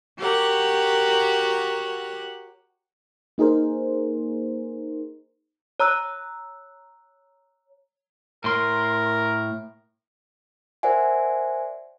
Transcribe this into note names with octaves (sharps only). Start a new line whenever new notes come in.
F#4 G4 A#4 C#5 F#5
A#3 D#4 G#4 A#4 C5
C#5 A#5 E6 F#6
A2 A#4 C6
A#4 C5 D5 E5 F#5 G#5